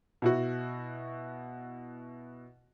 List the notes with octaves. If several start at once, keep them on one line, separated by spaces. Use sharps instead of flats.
B2 E4 F#4